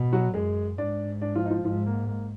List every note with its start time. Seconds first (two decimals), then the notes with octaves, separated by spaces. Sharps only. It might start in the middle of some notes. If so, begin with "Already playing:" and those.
Already playing: B2
0.13 F#3 F#4
0.34 F#2 G#3 G#4
0.78 G#2 D4 D5
1.21 D4 D5
1.35 F3 F4
1.45 D#4
1.51 F3 F4
1.64 G#2 F3 F4
1.86 A#3
2.08 A#3